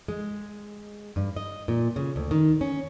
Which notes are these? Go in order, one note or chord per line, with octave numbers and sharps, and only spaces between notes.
G#3
G2
D#5
A#2
C#3
D2
D#3
C#4